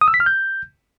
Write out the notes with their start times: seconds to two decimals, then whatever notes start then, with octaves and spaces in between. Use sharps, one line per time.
0.01 D#6
0.08 E6
0.14 B6
0.20 F6
0.26 G6